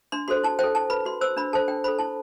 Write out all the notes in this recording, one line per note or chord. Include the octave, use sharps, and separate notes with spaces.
D4 C6
F#4 A4 C5 C6
E4 A5
A4 C5 G5
E4 A5
B4 B5
F#4 C6
C5 E6
D4 B5
A4 C5 A5
D4 G5
A4 C5 B5
E4 A5